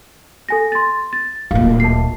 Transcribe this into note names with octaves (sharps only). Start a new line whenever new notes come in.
A4 G#5 A#6
C6 A6
A6
D1 A#2 F5
A5 C7